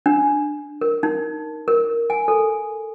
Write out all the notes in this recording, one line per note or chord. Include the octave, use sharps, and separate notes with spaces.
D4
A#4
D#4
A#4
G#5
A4